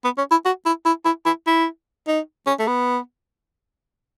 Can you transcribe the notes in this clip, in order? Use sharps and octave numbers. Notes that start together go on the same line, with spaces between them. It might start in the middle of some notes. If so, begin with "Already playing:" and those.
B3
C#4
E4
F#4
E4
E4
E4
E4
E4
D#4
C#4
A3
B3